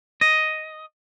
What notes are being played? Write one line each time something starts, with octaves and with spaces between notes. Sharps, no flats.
D#5